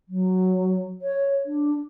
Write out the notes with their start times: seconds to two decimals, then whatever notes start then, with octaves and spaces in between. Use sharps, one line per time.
0.09 F#3
1.02 C#5
1.46 D4